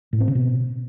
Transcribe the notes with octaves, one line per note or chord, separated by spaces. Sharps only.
A2
C4
C#3
B2